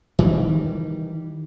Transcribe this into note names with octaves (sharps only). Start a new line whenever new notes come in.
D#3 E3 G3